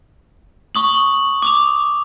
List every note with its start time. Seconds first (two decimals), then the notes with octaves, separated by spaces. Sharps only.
0.75 C#6 D#6 F#7
1.42 D6 D#6 F7